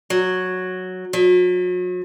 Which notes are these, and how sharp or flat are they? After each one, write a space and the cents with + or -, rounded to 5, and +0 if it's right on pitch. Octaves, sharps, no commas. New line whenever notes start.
F#3 -5
F#3 -40